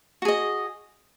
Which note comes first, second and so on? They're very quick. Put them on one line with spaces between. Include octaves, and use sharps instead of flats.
F#4 G#4 D#5